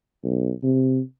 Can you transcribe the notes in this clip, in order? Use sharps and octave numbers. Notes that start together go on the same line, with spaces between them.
B1
C3